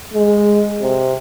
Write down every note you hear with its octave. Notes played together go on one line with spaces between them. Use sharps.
G#3
C3